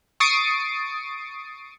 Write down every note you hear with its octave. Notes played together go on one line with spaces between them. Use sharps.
C#6 D#6 A6 C7 D7